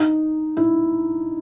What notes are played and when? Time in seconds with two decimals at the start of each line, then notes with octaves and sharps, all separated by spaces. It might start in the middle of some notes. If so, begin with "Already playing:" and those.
Already playing: D#4
0.57 E4